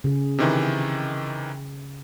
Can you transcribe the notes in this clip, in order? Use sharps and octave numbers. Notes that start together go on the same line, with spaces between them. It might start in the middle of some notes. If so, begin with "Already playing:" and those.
C#3 G#4
C3 D#3 E3